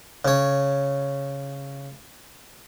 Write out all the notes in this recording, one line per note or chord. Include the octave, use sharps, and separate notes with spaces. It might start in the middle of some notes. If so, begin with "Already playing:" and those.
C#3 C#5